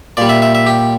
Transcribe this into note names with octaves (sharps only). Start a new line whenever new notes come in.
A#2 G3 D5
E5
E5
E5
G4